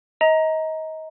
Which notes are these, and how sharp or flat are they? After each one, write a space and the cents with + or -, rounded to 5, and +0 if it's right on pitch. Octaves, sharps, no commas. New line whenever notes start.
D#5 +30 A#5 +0